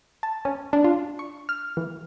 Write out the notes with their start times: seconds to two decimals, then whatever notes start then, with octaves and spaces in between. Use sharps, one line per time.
0.23 A5
0.45 C#4
0.73 D4
0.84 F4
1.19 C#6
1.49 F6
1.77 E3